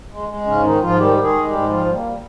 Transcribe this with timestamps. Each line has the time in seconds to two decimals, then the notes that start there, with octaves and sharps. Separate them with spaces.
0.11 G#3
0.29 G#3
0.46 G#2 C#3 C#4
0.63 D#3 D#4
0.81 G#2 F3 F4
0.99 D#3 G3 G4
1.17 D#3
1.22 G#3 G#4
1.34 G#3
1.45 G3 G4
1.51 G#2
1.69 F3 G3 F4
1.86 G3
1.92 A#3
2.04 G3